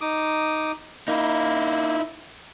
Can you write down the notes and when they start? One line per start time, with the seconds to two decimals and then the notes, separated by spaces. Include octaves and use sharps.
0.01 D#4 D6 D#6
1.08 A#3 D#4 E4